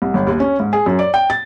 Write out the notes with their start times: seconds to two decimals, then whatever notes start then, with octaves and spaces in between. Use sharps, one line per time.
0.02 C2
0.14 G1
0.27 D#2
0.40 C#4
0.60 G#2
0.73 G#4
0.86 F#2
0.99 D5
1.14 G5
1.30 A6